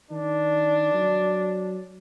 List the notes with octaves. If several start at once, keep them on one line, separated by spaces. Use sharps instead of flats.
D#3 D4
F#3